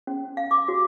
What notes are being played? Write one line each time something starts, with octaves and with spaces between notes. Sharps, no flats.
C#4
F5
D6
F#4